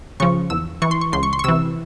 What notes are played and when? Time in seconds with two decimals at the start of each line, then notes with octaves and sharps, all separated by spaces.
0.20 C#3 F3 C#6
0.50 E2 E6
0.82 E3 C#6
0.91 C6
1.01 C#6
1.12 C#2 C6
1.23 C#6
1.33 C6
1.39 C#6
1.44 C3 E3 E6